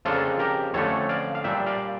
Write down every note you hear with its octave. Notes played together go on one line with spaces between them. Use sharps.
F2 C#3 F3 A#3 D4 F4 A4
G4 A#4
F2 D3 F3 A3 C#4 A4 C#5
D5 F5
F5
A#2 G3 D4 E5 G5
D5 F5